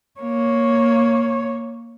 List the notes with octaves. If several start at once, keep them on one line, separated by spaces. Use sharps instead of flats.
A#3 C#5